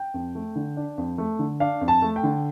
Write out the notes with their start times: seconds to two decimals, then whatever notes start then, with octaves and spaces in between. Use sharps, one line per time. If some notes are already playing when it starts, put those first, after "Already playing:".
Already playing: G5
0.14 F2
0.35 A3
0.56 D3
0.77 D4
0.98 F2
1.18 A3
1.39 D3
1.60 D4 F5
1.81 F2
1.88 A5
2.02 A3
2.16 G5
2.23 D3